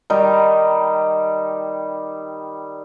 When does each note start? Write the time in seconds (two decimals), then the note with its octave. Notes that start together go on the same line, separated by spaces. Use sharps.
0.10 D#3 G3 D#4